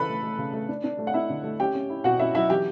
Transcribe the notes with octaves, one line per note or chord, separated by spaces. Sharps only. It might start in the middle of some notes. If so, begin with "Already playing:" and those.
Already playing: C#3 E3 A4 B4 B5
A3
A3
C#3
A3
D4
D4
A3
F#5
D4 E4 E5
D3
A3
C#4 G4 G5
C#4
E4
B2 F#4 F#5
C#4 E4 E5
F#3 E4 E5
E3 G4 G5